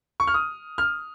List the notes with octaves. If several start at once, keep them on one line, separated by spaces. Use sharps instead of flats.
C#6
F6
D#6
F6